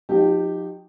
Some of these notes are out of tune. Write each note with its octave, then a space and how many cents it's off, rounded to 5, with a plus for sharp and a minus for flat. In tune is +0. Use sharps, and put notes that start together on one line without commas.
F3 +40 D#4 +0 G4 +0